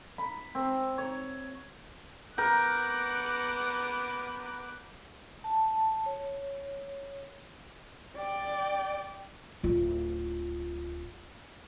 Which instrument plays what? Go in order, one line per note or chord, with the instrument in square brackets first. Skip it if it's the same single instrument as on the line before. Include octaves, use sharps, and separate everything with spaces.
[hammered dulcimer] B5
C4
C#5
[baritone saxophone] B3 [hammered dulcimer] A#4 [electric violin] D6 F#6 [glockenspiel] G6
[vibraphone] A5
C#5
[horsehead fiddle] D5 G5
[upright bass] D1 F4